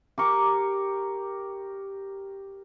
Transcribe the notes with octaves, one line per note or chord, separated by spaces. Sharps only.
G4 A#4 C#6 D6